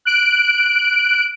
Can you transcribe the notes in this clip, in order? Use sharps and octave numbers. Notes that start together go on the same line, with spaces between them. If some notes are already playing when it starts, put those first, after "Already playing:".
F#6 D7